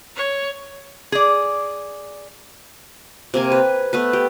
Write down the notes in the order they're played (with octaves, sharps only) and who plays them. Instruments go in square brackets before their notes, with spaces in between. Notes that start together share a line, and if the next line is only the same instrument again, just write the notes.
[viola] C#5
[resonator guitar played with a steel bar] G#4 D5
[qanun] C3 A#3 G#5
B4
A3 B3 B4
G4